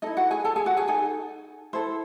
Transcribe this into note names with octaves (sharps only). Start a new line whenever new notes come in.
D#4 E4 A4 D#5
F#4 F#5
G#4 G#5
A4 A5
G#4 G#5
F#4 F#5
G#4 G#5
D#4 G#4 A4 G#5
E4 A4 C5